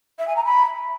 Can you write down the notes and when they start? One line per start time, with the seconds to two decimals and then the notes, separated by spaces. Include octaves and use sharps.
0.19 E5
0.27 G#5
0.36 A#5
0.45 B5